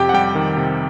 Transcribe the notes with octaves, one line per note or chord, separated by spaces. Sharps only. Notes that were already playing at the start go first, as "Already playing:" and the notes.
Already playing: F2 C3 G4 G5
F#5
G3 G4 G5
D#3
C3